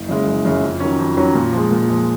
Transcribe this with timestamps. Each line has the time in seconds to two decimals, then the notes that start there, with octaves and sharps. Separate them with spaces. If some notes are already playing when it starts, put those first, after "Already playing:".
Already playing: F#1
0.09 F#2 C#3 G#3
0.27 F#1
0.45 F#2 C#3 G#3
0.63 F2
0.80 D#3 F#3 C#4
0.99 F2
1.17 D#3 F#3 C#4
1.35 A#2
1.53 F3 G#3
1.71 A#2
1.89 F3 G#3